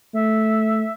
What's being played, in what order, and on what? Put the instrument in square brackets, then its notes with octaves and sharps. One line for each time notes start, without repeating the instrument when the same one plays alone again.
[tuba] A3 [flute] E5